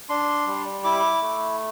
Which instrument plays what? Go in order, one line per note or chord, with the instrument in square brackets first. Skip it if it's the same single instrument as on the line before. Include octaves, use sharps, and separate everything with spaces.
[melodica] D4 C6
G3
E4 D6
A3